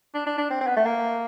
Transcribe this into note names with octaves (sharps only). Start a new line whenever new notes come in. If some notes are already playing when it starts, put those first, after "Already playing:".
D4
D4
D4
C4
C4
B3
A3
A#3